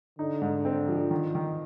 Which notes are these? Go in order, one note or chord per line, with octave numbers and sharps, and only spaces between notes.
D3 D#4
G#2
C4
F3
D#3
D#3